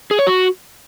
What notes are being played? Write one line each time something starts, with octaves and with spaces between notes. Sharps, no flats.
G#4
C#5
F#4